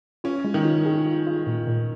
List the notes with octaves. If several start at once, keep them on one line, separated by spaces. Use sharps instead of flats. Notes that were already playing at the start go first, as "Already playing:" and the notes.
C#4 F4
G#3
D#3
F4
G#4
F4
F4
A#2
A#2